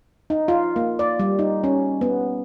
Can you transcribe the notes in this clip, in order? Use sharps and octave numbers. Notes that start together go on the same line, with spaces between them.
D#4
F4
A#3
D5
G3
D#4
C#4
B3